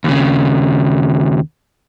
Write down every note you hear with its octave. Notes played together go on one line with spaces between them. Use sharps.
D#2 C#3